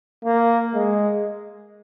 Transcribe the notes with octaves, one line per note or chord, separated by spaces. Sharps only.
A#3
G#3